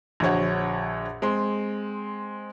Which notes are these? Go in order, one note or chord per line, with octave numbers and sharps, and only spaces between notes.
A#1 D3 F#4 C5 C#5 F#5
G#3 C4 C6